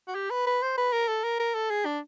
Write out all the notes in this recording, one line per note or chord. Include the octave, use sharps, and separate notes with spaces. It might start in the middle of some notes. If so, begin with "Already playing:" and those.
F#4
G4
B4
B4
C5
B4
A#4
A4
A#4
A#4
A4
G#4
D4